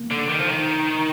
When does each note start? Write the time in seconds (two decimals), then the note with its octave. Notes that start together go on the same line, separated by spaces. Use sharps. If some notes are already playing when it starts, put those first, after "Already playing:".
Already playing: A#3
0.11 D3
0.29 D#3
0.38 F3
0.48 D#3